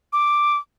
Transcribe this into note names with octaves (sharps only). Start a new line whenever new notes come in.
D6